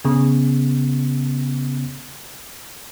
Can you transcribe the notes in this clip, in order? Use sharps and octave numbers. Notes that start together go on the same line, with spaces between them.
C#3 B3